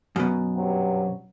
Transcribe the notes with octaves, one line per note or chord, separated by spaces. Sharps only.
F#2 B2
G2 C3 F#3